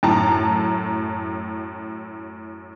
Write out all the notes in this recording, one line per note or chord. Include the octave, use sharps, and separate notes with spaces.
F#2 A2 A5 A#5